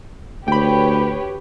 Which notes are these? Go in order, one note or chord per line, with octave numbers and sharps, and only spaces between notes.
D2 G4 B4 C#5 G5 B5